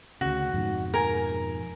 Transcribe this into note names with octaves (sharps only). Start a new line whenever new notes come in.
D2 C#3 F#4
F2 G#2 B2
A#4 G#5